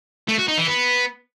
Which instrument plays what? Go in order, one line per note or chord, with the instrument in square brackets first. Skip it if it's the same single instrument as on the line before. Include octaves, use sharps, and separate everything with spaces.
[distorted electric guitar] A3
F#4
D#4
E3
B3